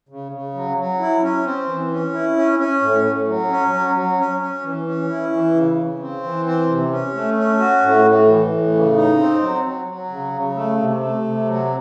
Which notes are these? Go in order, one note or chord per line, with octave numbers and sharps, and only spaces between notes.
C#3
C#3
F#3
F#3
E4
C#4
C4
E3
C#4
E4
C#4
C#4
A2
A2
F#3
C#4
F#3
F#3
C#4
C#4
E3
C#4
E4
E3
C#3
C#3
C4
E3
C4
C3
C#4
A3
C#4
F#4
A2
A2
E3
A2
C#3
D#4
C4
F#3
F#3
F#3
C#3
C#3
A3
C3
A3
C3
F#3